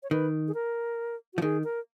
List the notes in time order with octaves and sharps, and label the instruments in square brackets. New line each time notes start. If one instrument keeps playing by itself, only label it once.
[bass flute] C#5
[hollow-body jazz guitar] D#3 [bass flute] B4
[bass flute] G#4
A#4
F#4
[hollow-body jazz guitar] F3
[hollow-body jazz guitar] D#3 [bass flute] G#4
[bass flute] A#4